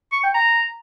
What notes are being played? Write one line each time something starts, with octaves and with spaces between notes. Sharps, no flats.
C#6
G5
A#5